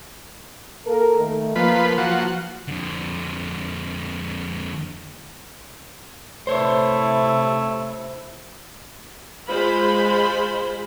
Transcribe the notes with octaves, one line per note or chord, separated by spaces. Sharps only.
A#3 A4 A#4
D#3 A3
F3 A#3 B4
F3 F#4
F2 D3
C3 A3 E4 C5 C#5
G#3 F4 C5 B5